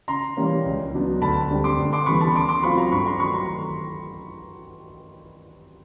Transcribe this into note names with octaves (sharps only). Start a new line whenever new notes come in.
C#3 A#5 C6
E3 G3 A#3 C#4
C#2
C#3 F#3 B3 D4
D2 A5 B5
D3 G3 C4
C6 D6
D2
C6 D6
C#3 E3 G3 B3 B5 C#6
A5 B5
C#3 C6 D6
C6 D6
F#3 A3 C4 F4 B5 C#6
A#5 C6
G2 B5 C#6
A#5 C6
D#3 F#3 A3 B5 C#6
A#5 C6